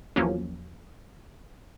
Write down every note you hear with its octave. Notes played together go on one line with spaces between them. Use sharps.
E2 F3 F#3 A#3 C#4